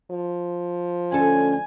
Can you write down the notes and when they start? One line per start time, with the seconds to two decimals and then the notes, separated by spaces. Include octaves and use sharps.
0.11 F3
1.12 D2 C#4 A4 G#5